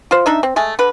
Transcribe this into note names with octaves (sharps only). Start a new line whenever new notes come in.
F4 C5
D4 D#4 E5
C4
G#3 A3 G#4
D3 B4